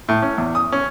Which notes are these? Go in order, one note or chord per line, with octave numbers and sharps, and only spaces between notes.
A2
C#4
E2
D#6
C#4